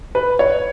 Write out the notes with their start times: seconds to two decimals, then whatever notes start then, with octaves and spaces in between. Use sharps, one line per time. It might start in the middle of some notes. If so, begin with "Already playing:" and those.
0.15 B4
0.39 C#5